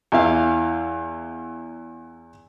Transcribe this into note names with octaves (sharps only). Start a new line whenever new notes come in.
E2 E4 F5